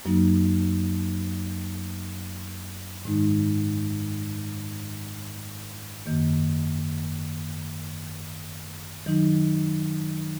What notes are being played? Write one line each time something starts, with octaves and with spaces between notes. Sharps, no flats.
F#2 F#3 A#3 D#4
G#2 D#3 G#3 D#4
F#2 D#3 A#3
D#3 F#3 D#4